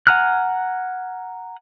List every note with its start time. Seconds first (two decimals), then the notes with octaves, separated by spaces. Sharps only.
0.07 F#5 G#5 A#5 F6 F#6